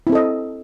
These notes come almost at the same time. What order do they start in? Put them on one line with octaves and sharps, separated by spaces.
E4 C4 A4 D#5